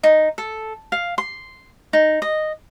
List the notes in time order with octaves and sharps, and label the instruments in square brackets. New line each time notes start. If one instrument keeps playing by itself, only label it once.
[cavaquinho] D#4
A4
F5
C6
D#4
D#5